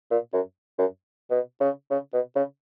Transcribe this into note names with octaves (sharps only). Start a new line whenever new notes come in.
A#2
F#2
F#2
B2
C#3
C#3
B2
C#3